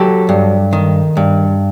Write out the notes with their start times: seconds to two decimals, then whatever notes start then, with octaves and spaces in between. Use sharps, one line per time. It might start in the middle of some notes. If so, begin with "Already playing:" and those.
Already playing: F#3 G4 A4
0.29 G2
0.73 D#3
1.17 G2